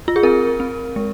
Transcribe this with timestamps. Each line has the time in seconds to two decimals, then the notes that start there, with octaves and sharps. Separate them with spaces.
0.08 F4
0.16 G#4
0.23 C4 A#4
0.60 C4
0.96 G#3